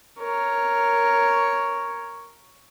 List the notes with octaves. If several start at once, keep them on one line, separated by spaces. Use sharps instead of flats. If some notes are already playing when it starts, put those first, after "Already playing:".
A#4 C#5